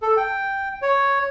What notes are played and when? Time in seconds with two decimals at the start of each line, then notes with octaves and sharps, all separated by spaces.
0.02 A4
0.17 G5
0.82 C#5